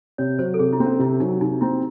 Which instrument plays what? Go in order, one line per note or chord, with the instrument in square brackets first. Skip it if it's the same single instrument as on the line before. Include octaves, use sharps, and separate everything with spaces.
[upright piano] C3 [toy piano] C#5
[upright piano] F#3 [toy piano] C5
[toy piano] A4
[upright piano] C3 [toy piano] G#4
[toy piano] E4
[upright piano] C4
[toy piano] C#4
[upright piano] C3 [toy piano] E4
[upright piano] F#3 [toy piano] D#4
[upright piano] C3 [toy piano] D#4
[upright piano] C4 [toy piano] E4